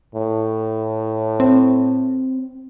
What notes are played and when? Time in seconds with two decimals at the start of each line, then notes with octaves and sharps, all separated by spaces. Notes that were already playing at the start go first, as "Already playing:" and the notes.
0.15 A2
1.40 C4